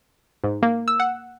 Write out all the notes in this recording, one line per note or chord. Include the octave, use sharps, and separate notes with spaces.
G#2
A#3
E6
F#5